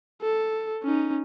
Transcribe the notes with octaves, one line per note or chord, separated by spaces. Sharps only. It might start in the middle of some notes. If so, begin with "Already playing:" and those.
A4
C#4 D#4